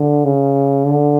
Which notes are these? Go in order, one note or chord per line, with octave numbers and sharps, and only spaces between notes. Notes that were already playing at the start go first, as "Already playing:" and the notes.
Already playing: D3
C#3
D3